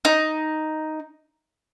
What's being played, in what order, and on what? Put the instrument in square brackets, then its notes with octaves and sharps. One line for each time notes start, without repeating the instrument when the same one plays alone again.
[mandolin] D#4